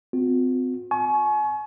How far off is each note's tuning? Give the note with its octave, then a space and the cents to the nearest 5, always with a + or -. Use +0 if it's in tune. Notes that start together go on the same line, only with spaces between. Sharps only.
C4 -35 F4 +45
G#5 +35 C#6 -5